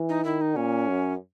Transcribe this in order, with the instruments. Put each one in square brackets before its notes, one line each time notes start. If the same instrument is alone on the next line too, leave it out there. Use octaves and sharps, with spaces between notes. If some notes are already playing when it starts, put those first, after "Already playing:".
Already playing: [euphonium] E3
[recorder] D#4
[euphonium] D#3 [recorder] E4
[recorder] D#4
[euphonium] A#2 [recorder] C#4
[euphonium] F#2